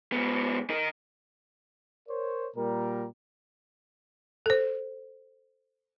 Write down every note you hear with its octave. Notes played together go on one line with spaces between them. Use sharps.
G#2 B3
D#4 A#4
A#4 C5 C#5
A#2 G3 A#4
A4 C5